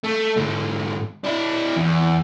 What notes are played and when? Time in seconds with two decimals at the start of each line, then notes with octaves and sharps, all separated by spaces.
0.04 A3
0.37 G#2 D3
1.24 D4 E4
1.76 E2